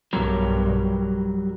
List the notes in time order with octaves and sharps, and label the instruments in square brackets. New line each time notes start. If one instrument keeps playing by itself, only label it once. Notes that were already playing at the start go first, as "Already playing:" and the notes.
[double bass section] B1 G2 [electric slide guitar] F#3 G3 A#4